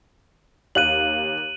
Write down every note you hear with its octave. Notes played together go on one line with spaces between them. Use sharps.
D#2 F5 F#6 D#7 F#7